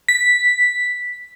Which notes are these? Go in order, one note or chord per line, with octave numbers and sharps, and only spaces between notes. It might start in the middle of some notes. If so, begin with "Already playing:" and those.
B6